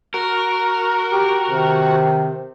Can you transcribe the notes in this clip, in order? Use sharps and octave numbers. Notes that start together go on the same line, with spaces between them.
F#4 A#4
G4
C3 D#3